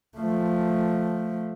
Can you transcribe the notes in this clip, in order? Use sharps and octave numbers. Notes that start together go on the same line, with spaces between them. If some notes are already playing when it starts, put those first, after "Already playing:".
F3 A3